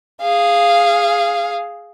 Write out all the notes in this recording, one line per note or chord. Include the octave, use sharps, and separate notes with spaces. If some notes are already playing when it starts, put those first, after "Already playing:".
G#4 F5